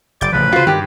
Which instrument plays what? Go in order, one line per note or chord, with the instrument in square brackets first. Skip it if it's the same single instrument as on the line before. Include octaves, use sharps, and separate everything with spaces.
[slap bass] F#1 [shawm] D5 [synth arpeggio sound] G6 A6
[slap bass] A1 C#3 F3 [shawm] B4
[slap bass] A#2 C#3 [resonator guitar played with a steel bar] F4 C5 [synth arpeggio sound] F#4
[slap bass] G2 [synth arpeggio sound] D#3 [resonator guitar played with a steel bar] G4